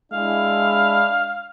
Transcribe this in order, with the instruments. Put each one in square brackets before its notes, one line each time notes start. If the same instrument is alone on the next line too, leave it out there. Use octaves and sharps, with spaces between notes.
[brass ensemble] G#3 D4 E4 [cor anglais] F5